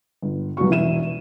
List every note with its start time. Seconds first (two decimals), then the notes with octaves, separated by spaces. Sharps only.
0.22 G1
0.57 F1 C2 F#3 B3 F#4 C#6
0.70 E1 E4 E5 D#7 E7